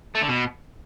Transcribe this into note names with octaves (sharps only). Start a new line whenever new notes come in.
A3
D3
B2